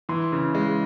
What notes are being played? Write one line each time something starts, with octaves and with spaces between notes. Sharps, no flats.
E3 C6
C#3
G#3